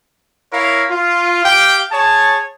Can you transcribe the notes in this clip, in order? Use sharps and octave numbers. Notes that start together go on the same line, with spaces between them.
E4 A#4 C#5 F5
F4
G4 F5 G5
G#4 C#5 A5